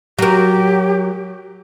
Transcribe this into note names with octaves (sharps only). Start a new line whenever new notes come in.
F#3 G4 A#4